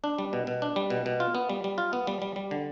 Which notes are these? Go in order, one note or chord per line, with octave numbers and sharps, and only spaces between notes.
D4
G3
B2
B2
D4
G3
B2
B2
F4
B3
G3
G3
F4
B3
G3
G3
G3
D3